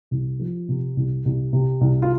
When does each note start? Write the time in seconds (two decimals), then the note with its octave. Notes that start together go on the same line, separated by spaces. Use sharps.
0.11 C2
0.39 F3
0.69 C3
0.97 C2
1.25 C2
1.53 C3
1.81 C2
2.02 F4